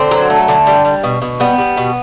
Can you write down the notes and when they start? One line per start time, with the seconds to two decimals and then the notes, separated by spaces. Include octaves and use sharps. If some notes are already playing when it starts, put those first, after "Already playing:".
Already playing: D3 C4
0.11 F#3
0.30 A3
0.48 D3
0.67 G3
0.85 G3
1.03 B2
1.22 B2
1.40 G3 B3
1.58 G3
1.77 B2